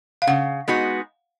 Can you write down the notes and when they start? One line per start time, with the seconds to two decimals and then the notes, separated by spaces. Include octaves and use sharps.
0.22 F5
0.27 C#3 F#5
0.68 G#3 B3 D#4 F#4